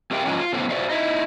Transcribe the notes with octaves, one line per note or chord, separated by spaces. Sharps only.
C4 G4 A#4 E5 F5 G5
F3 F#3 G#3 A#3 C#4
F4
F#2 A2 D3 B3 C5 F5
F#4 C5 D5 E5 F5
D#4 E4